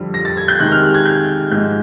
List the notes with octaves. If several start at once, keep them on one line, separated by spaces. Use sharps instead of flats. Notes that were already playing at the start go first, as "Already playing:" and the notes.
Already playing: F2 D3 G3
A#6
A6
G#6
G6
C3 D#3 G#3 F#6
F6
F#6
G#6
G6
G#2 F3 G#3 G6